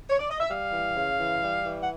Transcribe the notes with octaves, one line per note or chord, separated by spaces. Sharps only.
C#5
D5
D#5
E5
G3 F5
E3
C#3
E3
G3
E3
F#5